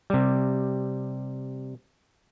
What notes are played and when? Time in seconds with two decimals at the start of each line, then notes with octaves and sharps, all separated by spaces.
0.10 C3 G3